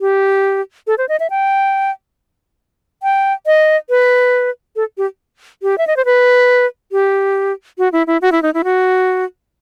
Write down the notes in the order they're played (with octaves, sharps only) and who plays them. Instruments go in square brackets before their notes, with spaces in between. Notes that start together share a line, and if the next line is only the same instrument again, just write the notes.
[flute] G4
A4
C5
D#5
E5
G5
G5
D#5
B4
A4
G4
G4
E5
D#5
C5
B4
G4
F#4
E4
E4
F#4
E4
D#4
E4
F#4